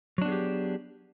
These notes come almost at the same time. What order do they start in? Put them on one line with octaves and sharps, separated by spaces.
F#3 D4 B3 G#4 G4